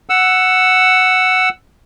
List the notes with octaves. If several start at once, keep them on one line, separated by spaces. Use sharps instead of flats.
F#5 E6